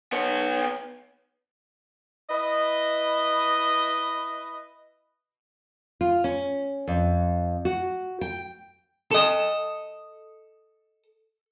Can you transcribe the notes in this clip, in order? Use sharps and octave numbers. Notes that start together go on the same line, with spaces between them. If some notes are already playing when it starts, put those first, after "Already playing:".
B3 C#5
E4 B4 D#5
F4
C#4
F2
F#4
G5
A4 D#5